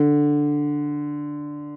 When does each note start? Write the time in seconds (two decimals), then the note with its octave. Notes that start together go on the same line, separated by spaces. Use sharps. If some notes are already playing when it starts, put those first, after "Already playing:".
Already playing: D3